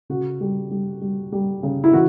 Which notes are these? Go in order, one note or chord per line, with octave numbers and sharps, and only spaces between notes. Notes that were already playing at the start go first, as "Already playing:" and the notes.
C#3 F#4
G3
G3
G3
G3
C#3
E4
E3 F#4